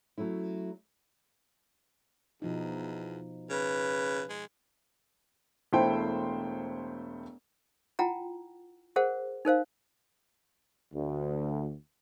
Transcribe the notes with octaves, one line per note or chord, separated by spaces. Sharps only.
F#3 A3 C#4 E4
E2 B2 F3 D#4
C#3 B4
G#3
E1 A3 E4 C5 G5
E4 F4 F#5 G5 A5 A#5
G#4 A#4 C5 F#5
D#4 A#4 C5 F5
D2